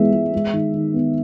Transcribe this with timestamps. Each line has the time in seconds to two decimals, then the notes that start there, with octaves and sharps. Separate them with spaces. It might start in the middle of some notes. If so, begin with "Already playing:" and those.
Already playing: E3 G#3 B3 E5
0.13 G#3
0.33 G#3
0.53 D#3
0.74 D#3
0.94 B3